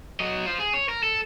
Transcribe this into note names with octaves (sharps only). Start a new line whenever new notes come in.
F#3 D#5
F4 C5
G#4
C#5
A#4
A4